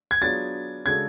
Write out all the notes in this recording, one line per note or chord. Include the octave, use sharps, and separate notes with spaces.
G#6
F#3 B3 D4 F4 G#4 A6
C#3 G#3 D4 F#4 A4 G#6